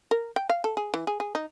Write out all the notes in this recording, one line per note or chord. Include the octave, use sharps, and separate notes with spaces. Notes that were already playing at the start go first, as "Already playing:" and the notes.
A#4
G5
F5
A4
G#4
E3
G#4
G#4
D#4